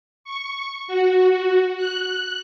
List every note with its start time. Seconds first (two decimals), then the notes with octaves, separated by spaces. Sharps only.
0.24 C#6
0.87 F#4
1.76 F#6